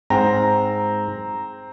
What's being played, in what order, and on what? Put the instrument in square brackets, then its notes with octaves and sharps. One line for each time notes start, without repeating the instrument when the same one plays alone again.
[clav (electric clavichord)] G#2 G5 [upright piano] C4 [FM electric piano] A#5